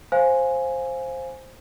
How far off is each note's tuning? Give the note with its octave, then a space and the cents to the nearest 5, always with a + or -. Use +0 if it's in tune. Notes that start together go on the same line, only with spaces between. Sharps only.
C5 +10 F5 +0 G#5 +0